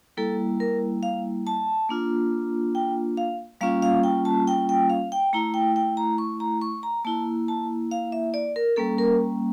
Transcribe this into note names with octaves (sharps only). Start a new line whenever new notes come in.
G3 A#3 E4 A4
A#4
F5
A5
A#3 D4 F4
G5
F5
G3 A#3 C#4 F4 F5
F5
G5
A5
G5
G5
F5
G5
A3 E4 A#5
G5
G5
A#5
C#6
A#5
C#6
A#5
A#3 E4 A5
A5
F5
E5
D5
A#4
G3 A#3 C#4 A4
A#4